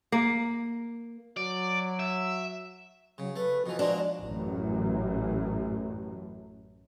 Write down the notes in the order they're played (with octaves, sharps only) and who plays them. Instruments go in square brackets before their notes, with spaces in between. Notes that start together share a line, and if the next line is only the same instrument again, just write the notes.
[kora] A#3
[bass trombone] F#3 [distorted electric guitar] D5
[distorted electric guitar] E5
[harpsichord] C#3 [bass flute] F#3
[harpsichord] A3 [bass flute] B4
[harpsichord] B2 E3 [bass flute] F3
[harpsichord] F#3 G#3 A#3 [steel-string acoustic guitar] D4
[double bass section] A1 F#2